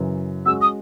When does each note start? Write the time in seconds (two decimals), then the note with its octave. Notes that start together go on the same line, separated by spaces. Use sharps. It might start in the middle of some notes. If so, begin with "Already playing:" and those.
Already playing: F#2 C#3 E3
0.45 G#3 C#4 F#4 E6
0.61 D#6